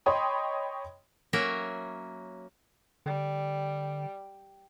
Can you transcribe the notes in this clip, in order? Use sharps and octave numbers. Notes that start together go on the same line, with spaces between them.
C#5 D#5 G5 B5 C6 D#6
F#3 A#3 C#4 A#4 E5
D3 G3